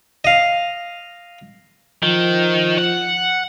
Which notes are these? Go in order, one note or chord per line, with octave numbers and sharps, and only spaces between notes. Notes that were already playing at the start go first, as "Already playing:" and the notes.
D#5 F5
D#3 F3
F#5